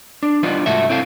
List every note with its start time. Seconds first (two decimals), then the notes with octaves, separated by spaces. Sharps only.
0.23 D4
0.43 E3 G3 B3 D4 D#4 F4
0.66 C2 G#2 A3 F#4 A4 E5
0.89 A2 C4 E4 A4 D#5 F5